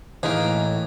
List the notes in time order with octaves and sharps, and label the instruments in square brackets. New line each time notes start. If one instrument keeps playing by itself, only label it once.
[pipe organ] A2 [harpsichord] E3 [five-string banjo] A#3 D#4 G#4